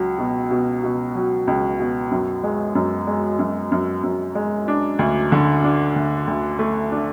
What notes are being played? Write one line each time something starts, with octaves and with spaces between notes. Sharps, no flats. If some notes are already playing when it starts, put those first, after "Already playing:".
Already playing: C#2 F#3
B2
B2
B2
F#3
C#2
B2
F#2
G#3
F#2
G#3
F#2
F#2
F#2
G#3
D4
D2
D3
D4
D2
D2
A3
D4